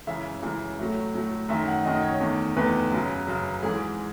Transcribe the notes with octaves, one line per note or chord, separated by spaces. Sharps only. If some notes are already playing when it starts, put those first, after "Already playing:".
F#2 C#3 E3 G#3 E5
F#2 C#3 E3 G#3
A2 F#3 A3
A2 F#3 A3
F#2 D#3 A3 E5
F#5
F#2 D#3 A3 D#5
C#5
E2 D#3 A3
E2 D#3 A3 B4
F#2 C#3 F#3
F#2 C#3 F#3
G#2 E3 G#3 G#4